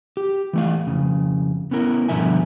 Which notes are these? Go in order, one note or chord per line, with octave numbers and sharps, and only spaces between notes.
G4
E3 A3 F5
F2 C#3
B3 C#4 E4 A#4
G2 B2 D3 F3 E5 G#5